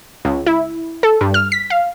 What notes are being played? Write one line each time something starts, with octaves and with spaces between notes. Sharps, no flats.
C#2
E4
A4
G2
F6
B6
F5